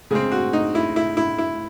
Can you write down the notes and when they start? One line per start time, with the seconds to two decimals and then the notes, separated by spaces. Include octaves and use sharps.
0.11 C#3 G#3 C4 G#4
0.31 F#4
0.53 D#4
0.75 E4
0.96 E4
1.17 E4
1.38 E4